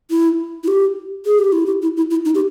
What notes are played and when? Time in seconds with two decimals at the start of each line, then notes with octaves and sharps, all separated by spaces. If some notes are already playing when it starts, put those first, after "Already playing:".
0.11 E4
0.64 E4
0.68 G4
1.26 G#4
1.39 G4
1.52 E4
1.66 G4
1.82 E4
1.97 E4
2.11 E4
2.25 D#4
2.35 G4